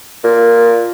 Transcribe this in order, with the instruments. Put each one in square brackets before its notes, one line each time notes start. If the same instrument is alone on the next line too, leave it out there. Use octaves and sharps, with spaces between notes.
[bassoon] A#2